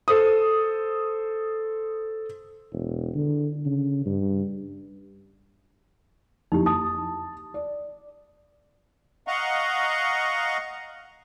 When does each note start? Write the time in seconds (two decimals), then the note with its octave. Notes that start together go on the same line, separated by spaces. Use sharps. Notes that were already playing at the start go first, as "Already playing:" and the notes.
0.08 A4 C5 D#6
2.72 E1
3.14 D3
3.66 C#3
4.06 G2
6.52 F#1 F2 D#4 E4 G4
6.66 A5 D#6
7.54 D5
9.28 D#5 F5 F#5 A#5 C#6